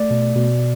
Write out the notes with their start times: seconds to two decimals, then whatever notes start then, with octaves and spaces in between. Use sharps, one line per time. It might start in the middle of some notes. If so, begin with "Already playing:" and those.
Already playing: A3 D5
0.11 B2
0.36 B2